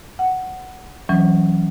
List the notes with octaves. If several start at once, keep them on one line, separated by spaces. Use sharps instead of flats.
F#5
E3 F#3 C#4